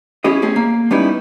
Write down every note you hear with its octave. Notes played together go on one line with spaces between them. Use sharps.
C#4 E4 G4 G#4 D#5
A3 C4 C#4 G#4
A#3
G3 B3 C#4 D#4 E4